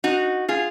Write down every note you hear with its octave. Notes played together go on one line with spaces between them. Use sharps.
D#4 F#4
F4 G#4